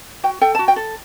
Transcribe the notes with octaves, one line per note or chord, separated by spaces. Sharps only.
F#4 G5
A4 G5
F#4 A5
G5
A4